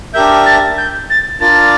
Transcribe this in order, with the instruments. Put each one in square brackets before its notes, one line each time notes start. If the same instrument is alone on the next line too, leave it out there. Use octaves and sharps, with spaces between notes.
[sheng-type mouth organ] D4 G4 A#4 E5 [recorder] G6
[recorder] A6
G6
A6
[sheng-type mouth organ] D4 F4 A#4 D5 [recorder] A6